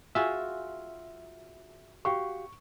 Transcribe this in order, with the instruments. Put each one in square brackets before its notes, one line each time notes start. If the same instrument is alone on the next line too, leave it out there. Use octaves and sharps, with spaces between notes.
[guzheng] F4 F#4 G#4 [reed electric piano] E5 [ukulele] G#5
[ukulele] F#4 G4 F5 [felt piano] C#6